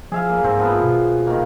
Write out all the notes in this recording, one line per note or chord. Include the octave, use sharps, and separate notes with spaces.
F3 G#4 E5 F5
A#3
G#2 C4
G#2 F3 B3 F5
B2
D#3 A#3